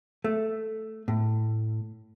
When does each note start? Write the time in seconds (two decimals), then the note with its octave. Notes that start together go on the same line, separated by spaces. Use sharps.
0.24 A3
1.08 A2